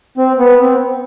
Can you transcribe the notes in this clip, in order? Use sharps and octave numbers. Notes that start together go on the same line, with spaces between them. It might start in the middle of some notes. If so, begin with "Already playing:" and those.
C4
B3
C4